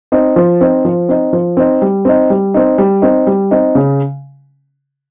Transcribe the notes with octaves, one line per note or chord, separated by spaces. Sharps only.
C4 D#4
F3
C4 D#4
F3
C4 D#4
F3
C4 D#4
G3
C4 D#4
G3
C4 D#4
G3
C4 D#4
G3
C4 D#4
C#3